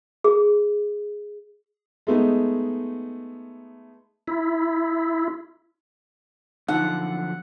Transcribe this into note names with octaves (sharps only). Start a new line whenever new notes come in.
G#4
G#3 A3 B3 D#4
E4
F#2 D3 F3 D#4 F#5